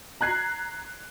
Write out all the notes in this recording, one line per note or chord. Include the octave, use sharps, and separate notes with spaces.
A#5 F#6 G#6 C7